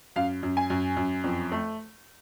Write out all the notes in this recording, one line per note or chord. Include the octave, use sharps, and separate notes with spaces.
F#2 F5
F#2
G#5
F#2
F#2
F2
A3